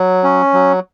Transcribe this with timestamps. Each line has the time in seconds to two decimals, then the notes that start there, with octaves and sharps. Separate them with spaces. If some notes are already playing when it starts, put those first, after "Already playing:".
Already playing: F#3
0.24 C#4
0.53 F#3